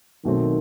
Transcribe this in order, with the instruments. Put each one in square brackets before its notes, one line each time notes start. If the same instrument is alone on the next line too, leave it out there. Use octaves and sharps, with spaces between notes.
[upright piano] B1 B2 A3 C4 [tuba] D#3